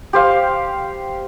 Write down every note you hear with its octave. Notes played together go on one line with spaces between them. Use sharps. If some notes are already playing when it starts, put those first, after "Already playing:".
G4 C5 F5